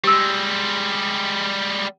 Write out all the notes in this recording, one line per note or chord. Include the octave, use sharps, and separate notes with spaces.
G3 G#3 G4 E6